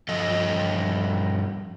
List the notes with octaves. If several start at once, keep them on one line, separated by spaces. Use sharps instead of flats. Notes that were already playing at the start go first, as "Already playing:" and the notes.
G2 F3 A4 D#5